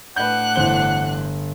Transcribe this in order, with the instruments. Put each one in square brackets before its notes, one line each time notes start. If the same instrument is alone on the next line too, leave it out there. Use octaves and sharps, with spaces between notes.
[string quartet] A2 D4 F#6 [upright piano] B4 G6 [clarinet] F#5
[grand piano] G1 G7 [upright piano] E3 C5